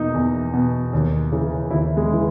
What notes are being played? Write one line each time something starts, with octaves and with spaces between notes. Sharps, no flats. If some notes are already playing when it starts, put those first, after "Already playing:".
Already playing: E2 B2 A#3 D#4
E2
B2
D#2
C#3 E3
D#2 E4
G#3
C#3 E3